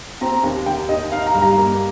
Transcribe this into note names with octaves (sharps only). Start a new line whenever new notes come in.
C4 A#5
D#2
D#2 G5
D#2 D#5
D#4 F5
A#5
G2
A#5
A#3